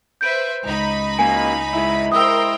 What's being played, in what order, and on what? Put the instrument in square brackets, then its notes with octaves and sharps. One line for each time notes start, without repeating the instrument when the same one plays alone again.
[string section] B4 C5 E5 [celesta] G6 D7
[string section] C#2 D#4 B5
[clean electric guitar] C#3 A#3 [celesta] G#5
[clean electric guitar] G#3 E4
[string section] A#4 C5 G5 [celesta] D#6 E6